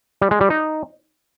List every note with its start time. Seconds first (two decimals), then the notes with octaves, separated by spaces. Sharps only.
0.21 G3
0.31 G#3
0.41 G3
0.50 D#4